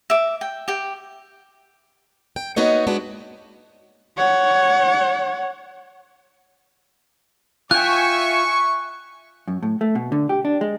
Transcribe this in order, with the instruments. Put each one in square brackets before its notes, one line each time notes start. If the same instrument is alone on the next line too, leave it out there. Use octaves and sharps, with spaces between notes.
[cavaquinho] E5 D6
G5
G4 G5
[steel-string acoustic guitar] G5
A#3 B3 D#4 F#4 C#5 D#5
G#3 B3 D4 E4 F#4
[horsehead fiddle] C#5 F#5
[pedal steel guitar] F4 G5 [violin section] E5 G#5 [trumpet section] C#6 [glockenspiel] F#6
[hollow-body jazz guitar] F#2
A2
A3
B2
D3
G4
D4
G#3